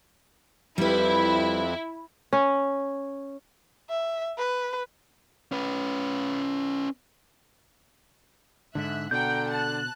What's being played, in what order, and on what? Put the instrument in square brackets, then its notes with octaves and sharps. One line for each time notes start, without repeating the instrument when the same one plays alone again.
[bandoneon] F2 [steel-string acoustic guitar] G3 B4 [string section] E4
[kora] C#4
[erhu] E5
B4
[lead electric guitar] C#4 B4
[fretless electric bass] G#2 D3 [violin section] E5 F#6
[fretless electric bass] B2 [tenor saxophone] D3 [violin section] F#5 G5 A#5 [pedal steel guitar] G6
[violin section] A5 F#6